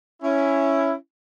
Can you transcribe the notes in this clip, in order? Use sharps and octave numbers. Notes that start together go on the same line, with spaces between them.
C#4 E4